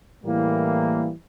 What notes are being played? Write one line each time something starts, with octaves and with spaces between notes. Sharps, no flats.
A2 E3 G3 A#3